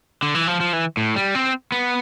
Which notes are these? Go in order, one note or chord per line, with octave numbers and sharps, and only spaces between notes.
D3
E3
F3
F3
E3
A2
G3
C4
B3